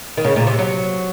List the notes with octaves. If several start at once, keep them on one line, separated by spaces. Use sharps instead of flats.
D#3
C#3
A#2
C3
F#3